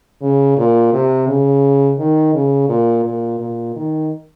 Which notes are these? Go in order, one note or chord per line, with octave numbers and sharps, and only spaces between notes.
C#3
A#2
C3
C#3
D#3
C#3
A#2
A#2
A#2
D#3